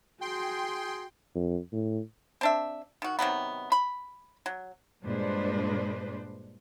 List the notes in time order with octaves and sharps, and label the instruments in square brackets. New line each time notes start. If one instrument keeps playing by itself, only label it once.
[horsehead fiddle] F#4 [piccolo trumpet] G#4 [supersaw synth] G5 C6
[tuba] F2
A2
[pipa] C4 D4 E5
D#3 F#4
C3 D#3 F#3 B3
B5
F#3
[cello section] G2 A#2 G#3 D4 B4 C5